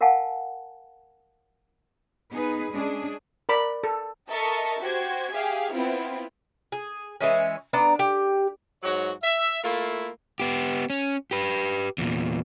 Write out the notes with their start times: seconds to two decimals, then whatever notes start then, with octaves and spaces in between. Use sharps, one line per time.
0.01 A#4 F5 F#5 G#5 A5
2.31 B3 D#4 G#4 B4
2.71 G#3 C#4 D4 G#4
3.49 A#4 D5 B5
3.84 A4
4.28 A4 A#4 D#5 E5 A5 C#6
4.80 F#4 G4 C5 G#6
5.32 G4 G#4 E5 F5
5.72 B3 C4 E4 F4
6.72 G#4
7.21 E3 G#3 C#4
7.73 B3 D4 A#5
7.99 G4
8.83 G#2 F#3 F#4 C#5
9.23 E5
9.63 A3 A#3 E4 F4
10.40 B3 G4
10.90 C#4
11.31 G4 B4
11.98 E2 A#2